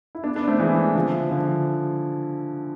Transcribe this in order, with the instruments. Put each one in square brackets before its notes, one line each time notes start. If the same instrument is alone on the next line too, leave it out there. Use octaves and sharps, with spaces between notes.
[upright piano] E4
B3 D4
B3 D4
A3 C4
E3 G#3
D3 F3
D3 F3